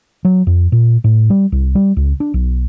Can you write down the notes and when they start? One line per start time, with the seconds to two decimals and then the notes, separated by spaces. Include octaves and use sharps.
0.25 F#3
0.47 F2
0.72 A#2
1.04 A2
1.30 G3
1.52 C2
1.75 G3
1.97 C#2
2.20 D4
2.34 B1